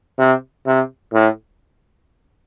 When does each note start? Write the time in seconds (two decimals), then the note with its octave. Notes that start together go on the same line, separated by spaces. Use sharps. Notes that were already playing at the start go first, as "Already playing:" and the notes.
0.19 C3
0.66 C3
1.13 A2